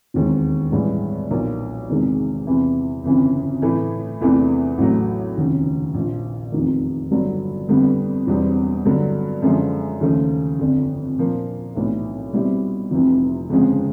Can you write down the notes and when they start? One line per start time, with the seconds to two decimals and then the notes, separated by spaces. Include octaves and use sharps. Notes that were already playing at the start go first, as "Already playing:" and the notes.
0.14 E1 D#2 D#3 G#3 C4
0.72 A1 G2 E3 G#3
1.30 B1 A#2 F3 A#3
1.89 E2 C3 D#3 G#3
2.47 E2 C3 E3
3.04 G1 F2 C#3 E3
3.62 A2 E3 A3
4.20 E2 C3 E3 A3 D4
4.78 A1 A2 F#3 A3
5.37 F1 D#2 C#3
5.94 A#1 A#2 F3
6.52 F1 E2 C3 D#3
7.11 G1 G2 D3 F#3
7.69 F2 D3 G3 B3 D4
8.27 E1 E2 B2 G3 C4
8.85 G2 D3 F#3
9.42 F#2 D3 F3 G#3
10.01 D#2 C#3 F3 A3
10.59 G1 F2 D3
11.18 A#2 F3 A#3 D4
11.75 B1 A2 E3 A3 D4
12.33 B2 G3 C4 E4 G4
12.91 F1 F2 C3 E3
13.49 G1 F2 C#3 F3 G#3